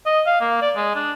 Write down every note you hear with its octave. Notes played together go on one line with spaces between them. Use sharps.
D#5
F5
A#3
D5
G#3
D4